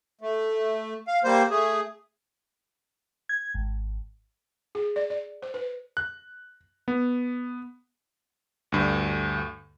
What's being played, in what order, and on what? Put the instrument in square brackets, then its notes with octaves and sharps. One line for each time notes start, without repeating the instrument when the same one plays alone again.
[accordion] A3
F5
G3 A#3 C5
A3 G#4
[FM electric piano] G#6
G#1
[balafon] G#4
D5
D5
C5
B4
[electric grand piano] F#6
B3
D2 G2